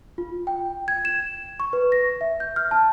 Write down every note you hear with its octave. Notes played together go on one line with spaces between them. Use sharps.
F4
G5
G#6
E7
C#6
B4
A#6
E5
G6
F6
A5